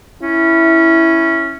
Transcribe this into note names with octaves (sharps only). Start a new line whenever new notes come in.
C#4 E4